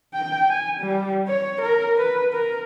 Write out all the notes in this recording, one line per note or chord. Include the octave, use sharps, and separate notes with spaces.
G5
G#5
G3
C#5
A#4
B4
A#4